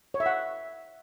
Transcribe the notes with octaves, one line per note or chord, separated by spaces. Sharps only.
C#5
E5
F#5